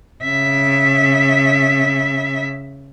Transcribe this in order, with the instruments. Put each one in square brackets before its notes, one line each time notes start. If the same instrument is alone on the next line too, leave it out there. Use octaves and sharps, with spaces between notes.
[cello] C#3 E5